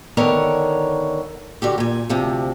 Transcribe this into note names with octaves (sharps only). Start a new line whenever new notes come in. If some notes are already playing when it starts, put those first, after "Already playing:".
D3 D#3 B3 A#4 C#5
D3 F#4 G4
A#2 G#5
D2 C3 F3